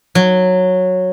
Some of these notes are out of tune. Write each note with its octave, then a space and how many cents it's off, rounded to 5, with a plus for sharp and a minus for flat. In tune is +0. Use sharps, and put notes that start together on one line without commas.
F#3 -10